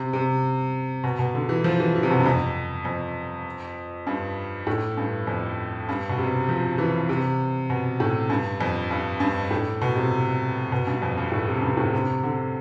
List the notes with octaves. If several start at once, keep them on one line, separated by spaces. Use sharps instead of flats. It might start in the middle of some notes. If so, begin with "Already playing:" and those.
Already playing: C3
C3
B2
B2
D3
E3
F3
E3
E3
C3
B2
G2
F2
F2
G2
A2
G2
F2
G2
B2
C3
F3
E3
C3
B2
A2
G2
F2
G2
G2
A2
B2
C3
B2
G2
F2
G2
A2
C3
G2
A2
C3
D3